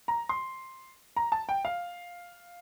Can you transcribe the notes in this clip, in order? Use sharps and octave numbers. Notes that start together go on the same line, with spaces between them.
A#5
C6
A#5
A5
G5
F5